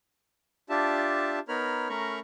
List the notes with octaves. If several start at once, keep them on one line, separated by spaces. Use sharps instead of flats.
D4 F4 G4 E5 A5
B3 D#4 A#4 C#5 B5 F6
A3 C#4 A#4 A#5 B5 C#6